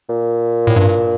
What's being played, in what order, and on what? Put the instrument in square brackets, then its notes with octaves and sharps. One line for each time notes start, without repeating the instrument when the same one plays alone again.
[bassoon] A#2
[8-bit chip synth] A2
G2